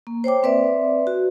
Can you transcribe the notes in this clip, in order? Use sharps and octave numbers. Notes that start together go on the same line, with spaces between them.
A#3
C5 C#5 G5 D6
C4 B4 D5 E5
F#4